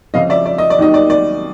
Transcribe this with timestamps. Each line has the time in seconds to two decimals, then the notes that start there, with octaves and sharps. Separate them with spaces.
0.14 F2 C#3 F3 D#5 F5
0.30 D5 E5
0.46 D5
0.58 D#5
0.70 D5
0.79 D#2 D#3 F#3 D#5
0.94 D5
1.10 D5